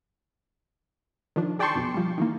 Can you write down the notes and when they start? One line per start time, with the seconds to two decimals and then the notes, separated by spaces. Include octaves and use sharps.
1.36 D#3 F3 D4
1.59 G#4 D5 G5 A5 C6 C#6
1.75 B1 F2 B2
1.94 F3 G3
2.18 D#3 E3 A#3